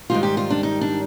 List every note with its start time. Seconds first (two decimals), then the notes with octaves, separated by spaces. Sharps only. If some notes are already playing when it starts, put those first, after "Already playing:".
0.10 G#2 D#3 G3 F4
0.23 G4
0.37 F4
0.50 D4
0.63 D#4
0.81 D4